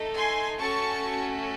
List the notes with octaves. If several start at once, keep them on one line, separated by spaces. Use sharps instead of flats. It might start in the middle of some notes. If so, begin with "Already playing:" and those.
Already playing: A3 D#4 A4
G#5 C6
A3 C#4 F#4 A4 A5 C#6